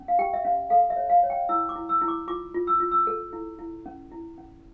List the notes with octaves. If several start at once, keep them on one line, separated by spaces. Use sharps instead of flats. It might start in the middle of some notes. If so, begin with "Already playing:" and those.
Already playing: C#4
F5
G4 G5
E5
C#4 F5
A4 F5
E5
C#5
F5
C#5
G5
E4 E6
D6
E4
E6
E4
D6
F4 D6
F4
E6
F4
E6
A4
E4
E4
C#4
E4
C#4